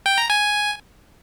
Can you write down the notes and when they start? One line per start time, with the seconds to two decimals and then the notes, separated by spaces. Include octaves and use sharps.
0.06 G5
0.18 A#5
0.30 G#5